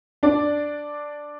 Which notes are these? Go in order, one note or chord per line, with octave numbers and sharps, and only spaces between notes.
D4 D5